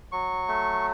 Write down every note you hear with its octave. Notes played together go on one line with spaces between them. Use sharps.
F#3 C#6
A3